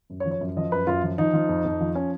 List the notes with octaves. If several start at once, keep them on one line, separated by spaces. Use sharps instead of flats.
F#2
C#5
F3
C#5
F#2
F3 D#5
F#2 B4
F#2 F4
F3
F3 D#4
F3
F2
F2
F3
C#4